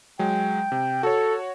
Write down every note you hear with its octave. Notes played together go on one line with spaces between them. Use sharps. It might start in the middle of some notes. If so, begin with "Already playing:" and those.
F#3 G#3 G5
C3
F#4 A4 C#5